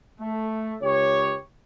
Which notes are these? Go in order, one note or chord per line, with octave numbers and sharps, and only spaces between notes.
A3
C#2 G4 C#5